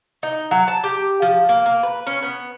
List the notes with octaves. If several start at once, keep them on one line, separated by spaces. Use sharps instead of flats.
D#4
F#3
A5
G4
F3
A#3
A#3
B4
C#4
B3